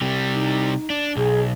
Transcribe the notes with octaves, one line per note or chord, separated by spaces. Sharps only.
C3 G3
D#4
D4
B1 G#4